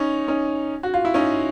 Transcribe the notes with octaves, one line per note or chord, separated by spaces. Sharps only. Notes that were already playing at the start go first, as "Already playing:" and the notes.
Already playing: C#4 D#4
C#4 D#4
F#4
F4
E4
C#4 D#4